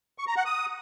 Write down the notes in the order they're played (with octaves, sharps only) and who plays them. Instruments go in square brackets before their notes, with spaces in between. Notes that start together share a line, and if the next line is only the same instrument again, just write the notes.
[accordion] C#6
A#5
F#5
D#6